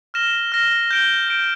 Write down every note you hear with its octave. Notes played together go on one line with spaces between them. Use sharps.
F6 A#6 E7 G7
F6 A#6 E7 G7
G6 D7 G7
G6 D7 G7